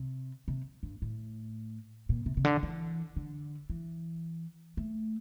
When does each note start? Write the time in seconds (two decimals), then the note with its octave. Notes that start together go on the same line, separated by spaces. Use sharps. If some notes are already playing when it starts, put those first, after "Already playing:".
Already playing: C3
0.48 C3
0.83 G2
1.02 A2
2.09 A#2
2.26 C3
2.37 C3
2.45 D3
2.63 E3
3.16 D3
3.70 E3
4.77 A3